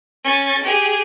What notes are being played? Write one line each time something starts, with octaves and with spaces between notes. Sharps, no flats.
C#4 A6
G4 G#4